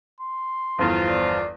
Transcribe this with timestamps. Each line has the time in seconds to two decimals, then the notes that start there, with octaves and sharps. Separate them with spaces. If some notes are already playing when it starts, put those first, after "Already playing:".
0.20 C6
0.79 G1 E2 F3 F4
1.10 D5